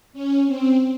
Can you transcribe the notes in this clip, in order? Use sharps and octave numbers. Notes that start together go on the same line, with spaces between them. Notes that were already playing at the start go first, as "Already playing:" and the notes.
C#4
C4